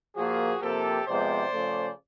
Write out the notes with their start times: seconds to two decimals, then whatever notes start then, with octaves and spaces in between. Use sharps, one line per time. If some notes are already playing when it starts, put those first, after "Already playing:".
0.16 A#2 F3 A#3 F#4 G#4
0.62 C3 F3 A#3 G4 A4
1.07 C3 F3 G#3 B3 C5 D5
1.53 C#3 F3 A3